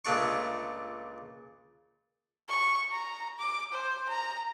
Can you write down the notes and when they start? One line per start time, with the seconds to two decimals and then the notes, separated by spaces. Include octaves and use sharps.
0.05 C#2 A#2 A3 D4 C#6
2.49 C#6
2.92 A#5
3.39 D6
3.72 C5
4.09 A#5